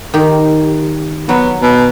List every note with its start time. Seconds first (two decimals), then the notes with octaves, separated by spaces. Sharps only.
0.14 D#3 G4
1.29 F#3 B3
1.62 B2